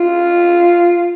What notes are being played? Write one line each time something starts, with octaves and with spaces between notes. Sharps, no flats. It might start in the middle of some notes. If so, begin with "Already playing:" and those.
Already playing: F4